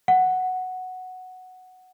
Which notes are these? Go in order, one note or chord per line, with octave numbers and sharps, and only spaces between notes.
F#5